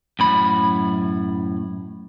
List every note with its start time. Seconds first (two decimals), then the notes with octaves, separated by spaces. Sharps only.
0.19 F#2 A2 B5